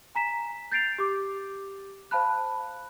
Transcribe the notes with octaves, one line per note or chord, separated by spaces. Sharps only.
G#5 A#5 B6 E7
G6 A6 C7 D7 F7
G4 D6
C5 F5 A5 B5 F#6